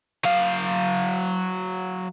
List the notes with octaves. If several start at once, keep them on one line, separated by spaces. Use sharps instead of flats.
F#3 F5